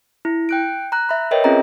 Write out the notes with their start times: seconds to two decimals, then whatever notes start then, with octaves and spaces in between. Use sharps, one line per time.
0.25 E4
0.49 G5 F#6 D7
0.92 A#5 F#6
1.09 E5 B5
1.31 A#4 B4 C#5 D#5 E5 G5
1.44 C4 C#4 F4 G#4 D#5 A#5